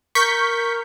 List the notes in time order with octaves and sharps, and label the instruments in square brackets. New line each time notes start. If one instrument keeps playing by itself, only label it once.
[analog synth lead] A#4 [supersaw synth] C#6 G6 B6